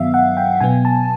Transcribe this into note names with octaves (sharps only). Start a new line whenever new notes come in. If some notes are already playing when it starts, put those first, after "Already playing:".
Already playing: G2 D#3 F#3 B3 E5 F5
F#5
G5
B2 F#3 B3 G#5
A5